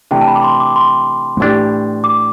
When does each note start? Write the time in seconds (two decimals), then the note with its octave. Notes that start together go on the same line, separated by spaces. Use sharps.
0.11 C3 E3 A3 D4 G5
0.21 A5
0.28 B5
0.35 D6
0.43 C6
0.60 D6
0.76 C6
1.40 A2 E3 A3 D4 G4
2.04 D6